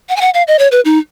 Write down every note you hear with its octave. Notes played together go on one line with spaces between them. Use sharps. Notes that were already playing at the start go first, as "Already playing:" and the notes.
F#5
G#5
F#5
F5
D#5
C#5
B4
D#4